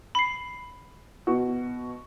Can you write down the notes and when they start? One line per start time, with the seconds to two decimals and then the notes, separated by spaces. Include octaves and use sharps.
0.15 B5 C7
1.27 B2 F#4